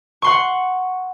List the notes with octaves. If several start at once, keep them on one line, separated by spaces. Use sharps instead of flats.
F#5 C6 C#6